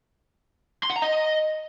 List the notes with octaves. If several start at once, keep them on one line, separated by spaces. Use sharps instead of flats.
C6
F#5
A#5
D#5